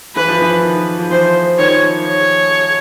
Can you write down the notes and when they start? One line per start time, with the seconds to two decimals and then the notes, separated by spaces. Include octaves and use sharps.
0.16 E3 B4
0.28 F3
0.42 E3
0.63 D#3
0.99 F3
1.11 E3 C5
1.58 D#3 F3 C#5
2.06 C#5